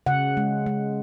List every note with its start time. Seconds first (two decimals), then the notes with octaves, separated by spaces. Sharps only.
0.06 C#3 F#5
0.37 G#3
0.66 G#3